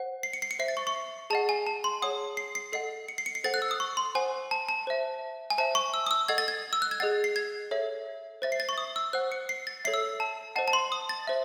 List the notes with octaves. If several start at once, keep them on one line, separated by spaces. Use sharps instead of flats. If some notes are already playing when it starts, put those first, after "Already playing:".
Already playing: C5 F#5
C7
C#7
C7
C#7
C5 E5 C7
A6
C#6
C#6
G#4 D#5 F#5 A5
G#5
A5
C6
G#4 C#5 F#5 D#6
C7
C7
A4 D#5 F#5 C7
C#7
C7
C#7
C7
A4 C5 F#5 A6
F#6
E6
D#6
C#6
C6
C5 F#5 G#5
A5
A5
C5 E5
G#5
C5 E5 A5
C#6
E6
D#6
E6
A4 D#5 F#5 G#6
A6
G#6
E6
F#6
G#6
G#4 D#5 F#5 A6
C7
G#6
A4 C#5 E5
C5 E5 A6
C7
A6
C#6
D#6
E6
C5 F#5 F#6
C#7
C7
A6
A4 C#5 E5 C7
E6
A5
C5 D#5 F#5 A5
A5
C6
D#6
A6
C5 E5